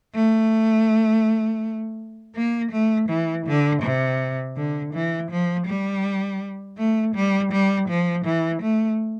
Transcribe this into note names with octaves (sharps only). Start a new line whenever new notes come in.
A3
A#3
A3
E3
D3
C3
D3
E3
F3
G3
A3
G3
G3
F3
E3
A3